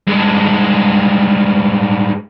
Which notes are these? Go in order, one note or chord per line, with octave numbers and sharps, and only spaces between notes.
G2 G#3